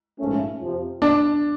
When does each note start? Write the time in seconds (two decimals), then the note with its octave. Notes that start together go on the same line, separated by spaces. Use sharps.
0.20 A#1 G#2 F3 A3 C#4
0.60 F2 C3 F3
1.02 D4